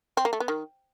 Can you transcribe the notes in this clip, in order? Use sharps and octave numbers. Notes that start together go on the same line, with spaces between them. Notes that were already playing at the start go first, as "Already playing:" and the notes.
C4
A#3
A3
B3
D#3